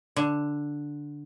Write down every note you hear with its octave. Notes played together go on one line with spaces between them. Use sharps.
D3